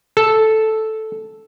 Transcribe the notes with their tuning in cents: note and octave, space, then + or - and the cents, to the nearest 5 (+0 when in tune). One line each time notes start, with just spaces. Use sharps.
A4 -5